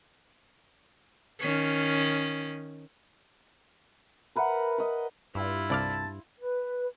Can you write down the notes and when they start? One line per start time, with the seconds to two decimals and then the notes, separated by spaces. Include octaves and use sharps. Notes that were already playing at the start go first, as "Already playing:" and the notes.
1.40 D#3 C#4
4.36 A#4 B4 E5 F#5
4.78 B4 D#5
5.35 G2 E4 F4
5.70 C2 D5 F5 A5
6.39 B4